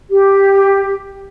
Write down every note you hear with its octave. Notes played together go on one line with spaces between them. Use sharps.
G4